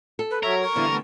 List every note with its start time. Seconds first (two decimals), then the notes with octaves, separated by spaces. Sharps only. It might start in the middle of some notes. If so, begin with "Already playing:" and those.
0.19 A4
0.31 B4
0.43 F#3 A#4 C#5 E5
0.63 C#6
0.76 D3 E3 G3 B3 E4 F5
0.90 A3 B3